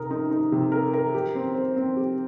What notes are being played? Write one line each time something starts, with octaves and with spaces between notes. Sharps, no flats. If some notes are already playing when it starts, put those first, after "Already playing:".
Already playing: C3 D#4 A#4
D#4
D#4
C3
A#4
A#4
G4
C4
C5
C4
G4